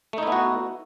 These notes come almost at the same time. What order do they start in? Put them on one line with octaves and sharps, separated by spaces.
A3 D#4 E4 B3 F#4